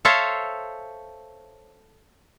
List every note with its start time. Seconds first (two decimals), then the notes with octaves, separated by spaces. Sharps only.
0.05 A4 C5 C#5 E5 F5